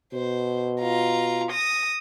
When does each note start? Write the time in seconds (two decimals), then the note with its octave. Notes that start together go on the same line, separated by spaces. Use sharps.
0.13 B2 C5
0.81 F4 A#5
1.51 D#6 A#6